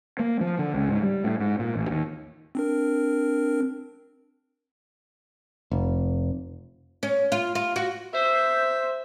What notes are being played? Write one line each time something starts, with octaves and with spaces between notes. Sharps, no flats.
A#3
F3
D3
C#2
G#2
G3
A2
G#2
A#2
A1
D#2
C4 D4 A#4
F1
C#4
F4
F4
F#4
C5 E5